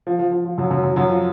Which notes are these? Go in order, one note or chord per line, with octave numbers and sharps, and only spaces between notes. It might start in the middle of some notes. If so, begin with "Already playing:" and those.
F3
F3
F3
F3
F#2 F#3
F#2 F#3
F#2 F#3
F#2 F#3
F3